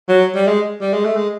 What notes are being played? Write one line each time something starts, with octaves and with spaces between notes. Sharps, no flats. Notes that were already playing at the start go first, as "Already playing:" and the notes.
F#3
G3
G#3
G3
G#3
A3
G#3